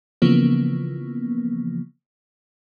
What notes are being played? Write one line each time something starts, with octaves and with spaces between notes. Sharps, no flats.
C#3 E3 F3 A#3 B3